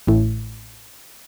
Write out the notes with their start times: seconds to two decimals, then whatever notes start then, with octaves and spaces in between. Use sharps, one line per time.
0.07 A1 A2